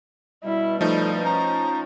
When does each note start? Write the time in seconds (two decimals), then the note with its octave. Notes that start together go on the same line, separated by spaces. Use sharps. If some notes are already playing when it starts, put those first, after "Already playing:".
0.44 B2 G3 E4
0.81 F3 A3 D#4 A4
1.25 C#4 A#5